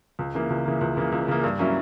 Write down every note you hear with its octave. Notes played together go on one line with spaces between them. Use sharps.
C#2
C#3 E3 A#3
C#2
C#3 E3 A#3
C#2
C#3 E3 A#3
C#2
C#3 E3 A#3
G2
F#3 A#3 C#4 E4